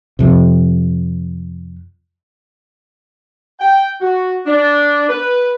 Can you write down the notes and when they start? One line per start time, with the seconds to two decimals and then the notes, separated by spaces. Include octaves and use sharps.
0.19 F2 C3
3.60 G5
4.01 F#4
4.47 D4
5.09 B4